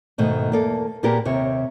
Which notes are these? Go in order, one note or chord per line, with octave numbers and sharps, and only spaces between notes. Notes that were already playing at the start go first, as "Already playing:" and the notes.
G#2 B2 D#3 A3
E2 A#3 A4
A#2 A#3 B3 G4 G#4 A#4
D#2 C3 C#5